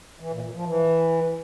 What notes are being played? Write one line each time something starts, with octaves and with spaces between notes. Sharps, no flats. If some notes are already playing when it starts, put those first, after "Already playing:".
E3
A#2
A#2
F3
E3